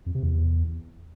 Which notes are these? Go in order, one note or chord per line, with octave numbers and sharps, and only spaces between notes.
F2
C3
E2